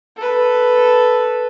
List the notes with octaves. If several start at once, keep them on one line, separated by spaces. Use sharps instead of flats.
A4 B4